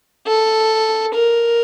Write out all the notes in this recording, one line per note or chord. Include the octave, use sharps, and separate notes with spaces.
A4
A#4